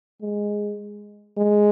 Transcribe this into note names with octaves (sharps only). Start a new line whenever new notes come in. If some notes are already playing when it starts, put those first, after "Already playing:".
G#3
G#3